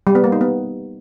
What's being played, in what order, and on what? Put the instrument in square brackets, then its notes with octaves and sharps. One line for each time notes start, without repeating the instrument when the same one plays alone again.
[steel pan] G3
B3
A#3
D#4
B3